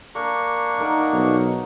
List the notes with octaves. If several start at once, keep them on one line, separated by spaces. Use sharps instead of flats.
A#3 D4 A#4 C#6
D#4 A#4 F#5
B1 C#5